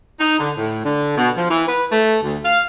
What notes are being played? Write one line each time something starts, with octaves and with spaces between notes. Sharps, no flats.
D#4
D3
A2
D3
B2
F3
E3
B4
A3
D2
F5